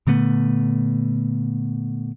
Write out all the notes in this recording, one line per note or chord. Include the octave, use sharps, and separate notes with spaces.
A#2 D3 A3 B3